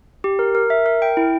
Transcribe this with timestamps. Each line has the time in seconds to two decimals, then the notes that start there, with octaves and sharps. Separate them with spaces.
0.24 G4
0.39 A#4
0.55 A#4
0.70 E5
0.86 A#4
1.02 G5
1.17 E4